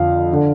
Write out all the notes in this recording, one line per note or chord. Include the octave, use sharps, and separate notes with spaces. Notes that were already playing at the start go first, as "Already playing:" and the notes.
Already playing: F2 D3 F5
D3